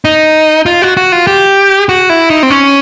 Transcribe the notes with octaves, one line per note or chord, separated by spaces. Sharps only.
D#4
F4
F#4
F#4
F4
G4
F#4
E4
D#4
C4
C#4